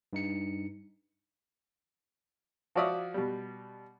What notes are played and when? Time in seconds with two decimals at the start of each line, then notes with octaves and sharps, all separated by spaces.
0.13 G2 D#4 C#7
2.75 F3 F#4 C#5 D5 E5 D#6
3.14 B2 G3